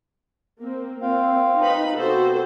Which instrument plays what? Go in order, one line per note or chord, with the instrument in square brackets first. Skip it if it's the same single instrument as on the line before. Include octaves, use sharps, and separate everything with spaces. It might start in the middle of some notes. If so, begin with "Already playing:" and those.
[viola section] A#3 C4
[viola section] C4 [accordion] F4 F5 G5
[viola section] D#4 B4 B5
[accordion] C3 B3 C4 [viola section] F#4 A4 C5